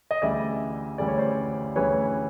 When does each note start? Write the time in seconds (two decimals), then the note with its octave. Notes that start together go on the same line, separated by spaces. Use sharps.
0.11 D#5
0.22 D2 C#3 E3 G3 D5 E5
0.98 D2 C#3 E3 G3 D5
1.08 C#5
1.18 C5 D5
1.76 D2 C#3 E3 G3 B4 C#5